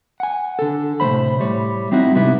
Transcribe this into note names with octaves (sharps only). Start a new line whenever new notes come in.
F#5 G#5
D3 A4
A2 C3 F3 C5 B5
A2 G3 C#5
G3 C4 D#4 E4 F#4
G#2 C3 G3 B3 E4